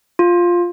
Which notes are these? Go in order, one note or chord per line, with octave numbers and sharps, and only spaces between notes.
F4